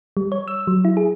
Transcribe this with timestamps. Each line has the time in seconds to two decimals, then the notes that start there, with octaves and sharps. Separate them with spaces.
0.17 G3
0.32 C#5
0.48 E6
0.67 F#3
0.85 E4
0.97 G#4